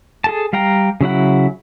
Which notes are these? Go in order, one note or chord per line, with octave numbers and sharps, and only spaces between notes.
G#4 A4 A5
G3 F5 G5 A#5
C#3 F#3 E4 F#5